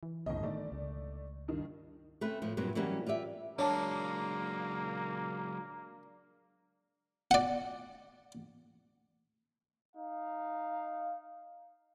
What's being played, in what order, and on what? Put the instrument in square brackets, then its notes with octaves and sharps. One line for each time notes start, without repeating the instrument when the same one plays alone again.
[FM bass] E3
[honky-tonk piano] G1 A2 D#5 [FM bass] C2
[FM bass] D#3 [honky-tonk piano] A3 D5
[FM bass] C#2
[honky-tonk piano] G2 D#3
[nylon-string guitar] A3 C4 C#4 B4
A2 F3
G2 A#2 F#3 C4
E3 F#3 G3 A#3 C#4 F#4
F4 G4 D5 E5
[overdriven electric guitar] F#3 G#3 [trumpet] A#3 [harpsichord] D4 [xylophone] C#5 A5
[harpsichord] D5 F#5
[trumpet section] D#4 F5